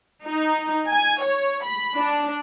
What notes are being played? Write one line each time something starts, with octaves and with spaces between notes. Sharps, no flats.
D#4
G#5
C#5
B5
D4